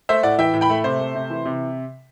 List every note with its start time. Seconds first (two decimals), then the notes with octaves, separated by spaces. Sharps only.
0.09 A3 C5 E5
0.23 A2 D5 F#5
0.38 E3 E5 G5
0.54 A2
0.61 G5 B5
0.70 A3
0.84 C3 C5
1.00 A3
1.15 C3
1.30 E3
1.46 C3